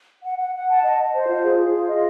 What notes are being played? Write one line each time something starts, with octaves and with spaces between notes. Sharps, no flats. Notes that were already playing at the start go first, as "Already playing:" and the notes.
F#5
F#5
F#5
A5
D#5
D#5
C5
F4
G#4
G#4
F4
D#5